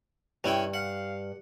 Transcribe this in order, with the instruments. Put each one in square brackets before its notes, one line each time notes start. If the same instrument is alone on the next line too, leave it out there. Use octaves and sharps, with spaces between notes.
[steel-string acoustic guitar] G2 [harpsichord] C#4 E4 G5
[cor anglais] F5 [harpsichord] F#5